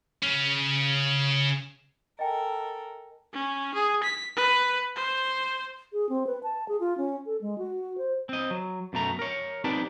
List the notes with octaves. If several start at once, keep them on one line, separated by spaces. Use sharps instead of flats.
C#3 C#4
A4 A#4 D#5 G5 G#5
C#4
G#4
B6
B4
C5
G#4
C4
B4
A5
G#4
F4
C#4
A4
G#3
F#4
C5
C4 D#5
F#3
F#2 B2 A3 A#5
A#4 C#5
C4 D#4 G4 B4 D5 A5